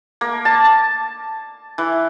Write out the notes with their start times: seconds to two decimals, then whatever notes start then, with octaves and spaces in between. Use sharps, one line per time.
0.21 A#3
0.45 A5
1.78 E3